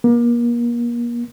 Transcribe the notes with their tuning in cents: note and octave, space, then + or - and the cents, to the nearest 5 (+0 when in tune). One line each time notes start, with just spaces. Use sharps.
A#3 +35